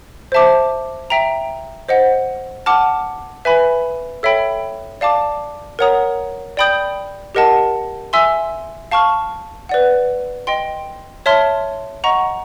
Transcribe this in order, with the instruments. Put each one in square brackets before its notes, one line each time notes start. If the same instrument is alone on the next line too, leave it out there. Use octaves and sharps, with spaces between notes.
[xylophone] C5 E5 A5 D6
E5 G5 A#5
C5 D#5 F#5
F#5 A5 D6 F6
B4 E5 G#5 B5
A4 C#5 E5 G5 B5
D5 F5 A5 D6
A#4 C#5 F#5 A#5 D#6
D5 G5 B5 D#6 G6
G4 A#4 D#5 F#5 A5
E5 G#5 C6 E6
F5 A5 C#6 F6
B4 D5 F#5
D#5 G5 C6
C#5 E5 A5 C6 F6
D#5 F#5 A#5 C#6